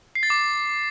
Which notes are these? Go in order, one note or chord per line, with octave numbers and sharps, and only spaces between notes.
C7
A6
D6